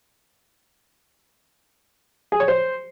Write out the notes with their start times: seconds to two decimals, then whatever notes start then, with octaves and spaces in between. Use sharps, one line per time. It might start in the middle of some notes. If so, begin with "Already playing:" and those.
2.32 G#4
2.40 C#5
2.48 C5